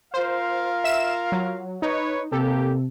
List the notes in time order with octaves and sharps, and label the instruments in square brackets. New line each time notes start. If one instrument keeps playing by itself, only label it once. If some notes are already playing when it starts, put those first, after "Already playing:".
[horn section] F4 A#4 F5 [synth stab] C5
[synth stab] E5 E7
F#3
[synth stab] D#4 [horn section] B4 C#5
[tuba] C3 [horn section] A#3 G4 [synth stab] A4